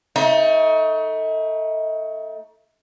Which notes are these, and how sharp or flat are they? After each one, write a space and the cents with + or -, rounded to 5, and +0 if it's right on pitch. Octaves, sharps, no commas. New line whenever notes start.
A3 +20 D#4 +35